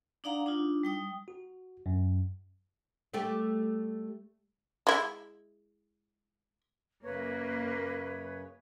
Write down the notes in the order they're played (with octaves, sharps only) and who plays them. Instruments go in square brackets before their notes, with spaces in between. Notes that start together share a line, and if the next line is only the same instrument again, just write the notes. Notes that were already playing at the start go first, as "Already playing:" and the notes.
[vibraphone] D4 D#4 D5 F5 F#5 A#5
D4 D#4 F4
G3 G5 D#6
[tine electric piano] F#4
F#2
[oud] G3 A3 G4
[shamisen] G#3 E4
[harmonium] F#2 C#3 C#5 [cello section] A#3 [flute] B4